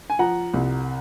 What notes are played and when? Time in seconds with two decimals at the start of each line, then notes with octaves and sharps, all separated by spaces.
0.10 G#5
0.19 F3 F#5 A#5
0.54 C2